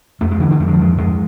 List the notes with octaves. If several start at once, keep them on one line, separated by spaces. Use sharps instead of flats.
F2 A3
G#3
D3 E3
D3
F2 A3
G#3
F3
F2 G#3
F2 G#3